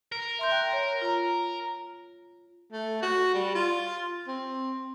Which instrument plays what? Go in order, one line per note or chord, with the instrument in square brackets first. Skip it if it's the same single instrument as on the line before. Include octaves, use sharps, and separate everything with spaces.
[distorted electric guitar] A#4
[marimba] E5 C6 G6
G5 F#6
C#5
F4 A#5
[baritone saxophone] A3
F#4
G3
F4
C4